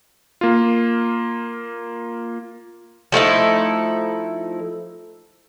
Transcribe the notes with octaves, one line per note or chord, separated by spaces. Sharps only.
A#3 F4
F3 A3 D#4 E4